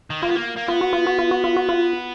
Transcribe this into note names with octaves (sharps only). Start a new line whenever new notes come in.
D#3
A#3 F4
B3
A#3
A#3
B3 F4
F#4
F4
F#4
F4
F#4
F4
F#4
F4